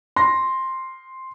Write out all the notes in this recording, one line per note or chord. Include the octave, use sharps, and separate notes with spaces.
C6 A#6